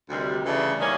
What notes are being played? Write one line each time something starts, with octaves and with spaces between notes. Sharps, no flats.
D2 C3 D#3 G3
C#3 E3 A3 D4
D#3 G3 A#3 C#4